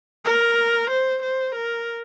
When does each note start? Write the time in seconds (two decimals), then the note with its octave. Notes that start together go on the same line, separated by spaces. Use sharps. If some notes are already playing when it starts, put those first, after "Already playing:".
0.25 A#4
0.90 C5
1.23 C5
1.55 A#4